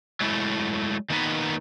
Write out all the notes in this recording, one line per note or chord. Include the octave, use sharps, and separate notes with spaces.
F#3 G#3 A3 E4
D#3 A#3 B3 D#4 B4